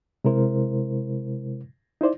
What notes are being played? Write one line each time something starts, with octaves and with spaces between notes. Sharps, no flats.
C3 G#3 E4 A#4 C5
D#4 E4 C5 D5